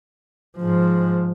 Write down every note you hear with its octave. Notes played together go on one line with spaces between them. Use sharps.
G#2 F3